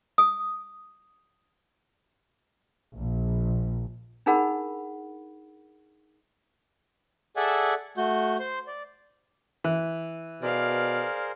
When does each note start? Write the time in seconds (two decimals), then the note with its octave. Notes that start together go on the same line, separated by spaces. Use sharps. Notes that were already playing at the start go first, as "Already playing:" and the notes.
0.18 D#6
2.96 A#1
4.26 D4 D#4 G#4 A#4 F#5 B5
7.37 G#4 A4 D5 E5 F#5 G#5
7.97 A3 F#4 G6
8.40 C5 C6
8.67 D5
9.64 E3
10.42 B2 G#4 A#4 C5 D5 F5